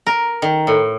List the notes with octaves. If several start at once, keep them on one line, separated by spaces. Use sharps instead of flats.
A#4
D#3
A2